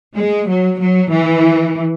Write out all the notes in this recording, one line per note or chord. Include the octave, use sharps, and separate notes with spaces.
G#3
F#3
F#3
E3